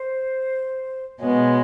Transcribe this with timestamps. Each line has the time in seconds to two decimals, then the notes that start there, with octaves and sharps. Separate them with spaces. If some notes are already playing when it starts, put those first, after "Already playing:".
Already playing: C5
1.20 B2 G#3 B3 C#5